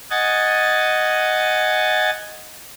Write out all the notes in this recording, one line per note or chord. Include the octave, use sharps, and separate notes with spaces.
D#5 F#5 G#5 A6